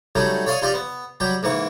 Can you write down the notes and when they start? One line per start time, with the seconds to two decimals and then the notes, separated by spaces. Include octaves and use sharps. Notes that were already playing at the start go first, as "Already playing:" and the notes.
0.15 F#3 G3 A3 C#4 D#4
0.46 C#5 D5 F5 C6 C#6 D#6
0.62 D#4 F4 G4 D5 D#5
0.74 B3
1.20 F#3 G3 G4
1.43 G#2 E3 A#3 C#6